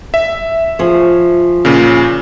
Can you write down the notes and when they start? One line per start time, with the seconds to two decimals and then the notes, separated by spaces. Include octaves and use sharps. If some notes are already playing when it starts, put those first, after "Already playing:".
0.14 E5
0.79 F3 G#4 C#5
1.65 A#2 C#3